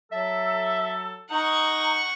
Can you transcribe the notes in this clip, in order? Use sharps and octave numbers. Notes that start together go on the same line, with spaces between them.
F#3 A4 E5
D#4 F#5 A#5 C#6